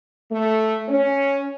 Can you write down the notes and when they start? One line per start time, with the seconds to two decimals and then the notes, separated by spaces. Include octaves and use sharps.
0.31 A3
0.88 C#4